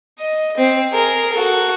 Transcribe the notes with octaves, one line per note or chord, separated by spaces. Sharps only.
D#5
C4
G#4 A#4
F#4 A4